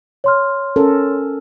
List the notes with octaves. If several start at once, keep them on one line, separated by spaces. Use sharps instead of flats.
C#5 C6 F6
C#4 A4 A#4